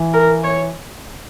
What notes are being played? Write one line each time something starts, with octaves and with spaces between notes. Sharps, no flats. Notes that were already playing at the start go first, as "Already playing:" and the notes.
Already playing: E3
A#4
C#5